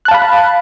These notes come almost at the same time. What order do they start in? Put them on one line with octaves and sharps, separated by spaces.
F#6 A5 F5 B5